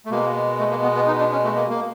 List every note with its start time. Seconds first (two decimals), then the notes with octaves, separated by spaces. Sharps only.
0.05 A3
0.10 B2 G#3 A#3
0.59 A3
0.71 A#3
0.83 B3
0.95 B3
1.07 D#4
1.19 D4
1.32 C#4
1.44 A3
1.56 A#3
1.70 A#3